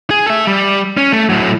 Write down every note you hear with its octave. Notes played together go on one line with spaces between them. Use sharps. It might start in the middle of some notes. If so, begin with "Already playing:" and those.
G#4
A4 E5
G3
C#4
A3
A2 F#3